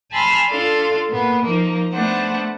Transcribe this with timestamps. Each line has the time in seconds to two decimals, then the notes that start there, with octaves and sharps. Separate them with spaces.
0.11 G#5 A5 B5 C6 E6 F6
0.49 D4 F4 A4 F5 C6
1.10 A#2 B3
1.45 F3 A#3 D#4
1.92 A3 B3 D4 C5 F#5